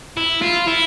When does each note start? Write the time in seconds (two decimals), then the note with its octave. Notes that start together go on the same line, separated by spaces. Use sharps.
0.17 E4
0.42 F4
0.68 E4